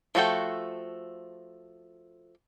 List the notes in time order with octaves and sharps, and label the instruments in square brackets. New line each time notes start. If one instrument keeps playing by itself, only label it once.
[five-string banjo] F3 A3 F#4 A4 G5